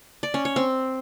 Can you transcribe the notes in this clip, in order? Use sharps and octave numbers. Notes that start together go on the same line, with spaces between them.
D5
C#4
C#5
C4